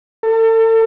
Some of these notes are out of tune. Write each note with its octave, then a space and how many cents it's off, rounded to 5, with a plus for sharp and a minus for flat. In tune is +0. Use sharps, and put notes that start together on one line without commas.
A4 +35